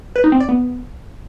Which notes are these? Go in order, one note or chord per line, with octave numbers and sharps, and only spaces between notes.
B4
D#4
C4
D5
B3